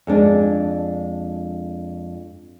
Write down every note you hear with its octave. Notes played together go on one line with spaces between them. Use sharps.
F2 G#3 D4